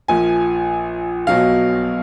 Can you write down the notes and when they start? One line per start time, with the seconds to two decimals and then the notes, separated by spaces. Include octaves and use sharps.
0.08 A#1 A#2 F3 G#5
1.27 B1 B2 F#3 F5